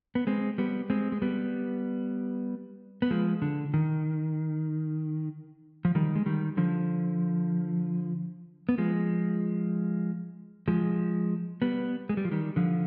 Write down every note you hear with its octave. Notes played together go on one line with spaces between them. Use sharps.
B3
G#3 C4
G3 B3
G#3 C4
G#3
G3 B3
B3
F3 G#3
D3
D#3
F3
D#3 G3
G#3
D#3 G3
D3 F3
B3
F3 G#3
F3 G#3
G3 B3
G#3
G3
F3
D#3 G3
D3 F3